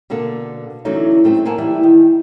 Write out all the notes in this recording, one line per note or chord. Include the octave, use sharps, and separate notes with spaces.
B2 D3 A#3 A4
D3 E3 F#3 A3 C#4 D#4
G3 A3 C4 E4
A#3 E4 F#5 G#5 A5
E3 G3 E4
D#3